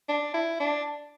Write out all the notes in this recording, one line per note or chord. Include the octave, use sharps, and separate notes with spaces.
D4
E4
D4